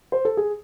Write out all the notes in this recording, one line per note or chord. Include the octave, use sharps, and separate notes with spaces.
C5
A4
G#4